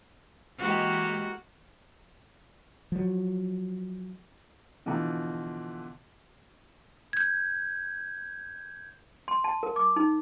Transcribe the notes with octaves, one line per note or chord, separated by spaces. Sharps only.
E3 G#3 A#3 F#4 G4
F3 F#3
B2 D3 E3 F3
G6 G#6
C6
A5
A#4
D6
D#4